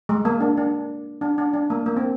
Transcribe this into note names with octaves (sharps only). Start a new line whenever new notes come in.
G#3
A#3
D4
D4
D4
D4
D4
A#3
A#3
C4